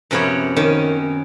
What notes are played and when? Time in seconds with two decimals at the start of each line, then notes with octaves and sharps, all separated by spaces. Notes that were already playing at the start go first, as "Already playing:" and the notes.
0.11 F#2 C3 F3 B3 C#5
0.56 D#3 C#4